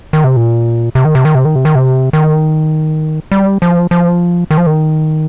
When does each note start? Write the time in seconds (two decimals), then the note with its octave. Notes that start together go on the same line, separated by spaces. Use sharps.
0.13 D#3
0.24 C3
0.36 A#2
0.95 C3
1.05 D#3
1.15 C3
1.25 D#3
1.35 C3
1.45 D#3
1.56 C3
1.65 D#3
1.75 C3
2.13 D#3
3.32 G3
3.62 F3
3.91 F3
4.51 D#3
4.58 F3
4.66 D#3